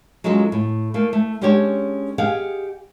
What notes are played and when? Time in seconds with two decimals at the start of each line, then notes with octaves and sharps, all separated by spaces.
0.24 F#3 G#3 C#4 D#4 F4 A4
0.52 A2
0.94 A3 A#3
1.13 A3
1.41 G#3 C#4 D4 G4 A4 C#5
2.18 G4 G#4 D#5 F5 F#5 G#5